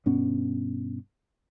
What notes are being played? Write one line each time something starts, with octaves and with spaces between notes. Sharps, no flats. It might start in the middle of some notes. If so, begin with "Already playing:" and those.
G2 B2 B3 C#4